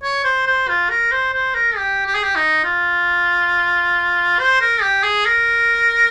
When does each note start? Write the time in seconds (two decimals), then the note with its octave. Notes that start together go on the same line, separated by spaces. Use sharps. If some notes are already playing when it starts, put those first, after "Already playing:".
0.03 C#5
0.24 C5
0.47 C5
0.68 F4
0.90 A#4
1.12 C5
1.33 C5
1.55 A#4
1.77 G4
2.06 G4
2.15 G#4
2.23 G4
2.35 D#4
2.64 F4
4.39 C5
4.61 A#4
4.82 G4
5.03 G#4
5.25 A#4